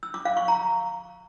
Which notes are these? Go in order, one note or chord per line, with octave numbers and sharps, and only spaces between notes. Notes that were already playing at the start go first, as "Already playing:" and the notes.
E6
D6
F5
C#6
A#5